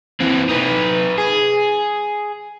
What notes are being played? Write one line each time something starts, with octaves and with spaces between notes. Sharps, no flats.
E3 C4
D#4 B4
G#4